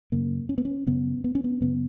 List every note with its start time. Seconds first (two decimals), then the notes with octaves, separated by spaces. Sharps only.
0.12 F#2 C#3 A#3
0.49 C#4
0.58 B3
0.65 C#4
0.86 F#2 C#3 B3
1.24 B3
1.35 C#4
1.44 B3
1.61 F#2 C#3 B3